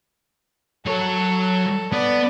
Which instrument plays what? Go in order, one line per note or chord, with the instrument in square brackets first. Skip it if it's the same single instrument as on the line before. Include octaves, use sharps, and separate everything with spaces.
[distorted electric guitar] F#3 C#5 [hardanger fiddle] A4
[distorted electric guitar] B3 [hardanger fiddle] D5